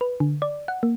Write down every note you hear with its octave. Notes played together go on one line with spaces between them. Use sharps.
B4
D3
D5
F#5
A#3